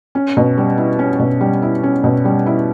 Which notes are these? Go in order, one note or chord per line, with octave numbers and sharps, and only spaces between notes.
C#4
B2
G3
E4
C#4
B2
G3
E4
C#4
B2
G3
E4